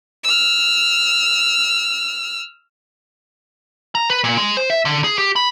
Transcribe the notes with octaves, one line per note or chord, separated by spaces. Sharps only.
E6 F6
A#5
B4
A#2
G#3
C5
E5
D3
G#4
G4
B5